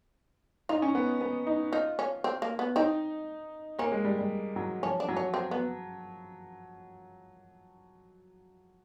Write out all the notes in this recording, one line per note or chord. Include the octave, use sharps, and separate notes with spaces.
D#4 F4
C#4
B3
B3
D#4
D#4 F4
C#4
C4
A#3
B3
C4 D#4
A#3 C#4
G#3
G3
G3
F#3
F3 C#4
D4
F#3
C#4
C4
B3